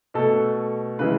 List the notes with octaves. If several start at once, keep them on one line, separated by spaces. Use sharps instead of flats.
B2 A3 A4
C#3 E3 G#3 B4